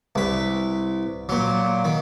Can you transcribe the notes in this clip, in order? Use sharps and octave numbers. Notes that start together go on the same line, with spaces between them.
C2 B4
A#2 F#3
D#3